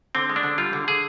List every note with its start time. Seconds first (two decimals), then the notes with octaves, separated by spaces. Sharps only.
0.15 D3 C4
0.30 G#3
0.36 D4
0.43 D3
0.58 G3 F4
0.73 D3
0.88 D3 G#4